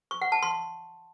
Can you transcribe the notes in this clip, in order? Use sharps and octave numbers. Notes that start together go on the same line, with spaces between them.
C#6
F#5
A5
C6